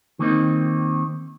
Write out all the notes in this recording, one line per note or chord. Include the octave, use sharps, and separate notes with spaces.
D#3 A#3 C4 D#4